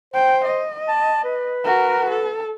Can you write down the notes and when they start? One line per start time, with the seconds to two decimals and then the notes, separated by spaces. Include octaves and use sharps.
0.14 C5 G5
0.45 D#5
0.88 A5
1.24 B4
1.65 F#4 A#4
2.10 A4